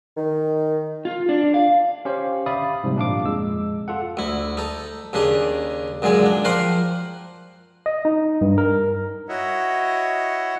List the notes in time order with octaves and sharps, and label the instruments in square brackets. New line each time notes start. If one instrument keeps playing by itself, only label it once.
[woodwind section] D#3
[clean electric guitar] F4
D4
F5
[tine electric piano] C#4 G4 C5 F5
D5 E5 F5 B5 D#6
G#2 C3 F3 G3
A#2 D4 F5 D6
F2 G#3 E6
F4 A4 F#5
[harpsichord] D2 E4
D#4 A4
D#2 C#3 D4 D#5 A#5
F#2 A#2 D3 G#3 G#5
D4
F3 A#4 C5 F#5 G5 C6
[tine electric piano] D#5
D#4
G2
A#4
[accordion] E4 F#4 C#5 D#5 E5 F#5